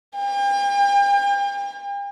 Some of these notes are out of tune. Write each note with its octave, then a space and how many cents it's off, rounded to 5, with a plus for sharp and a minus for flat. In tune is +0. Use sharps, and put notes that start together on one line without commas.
G5 +40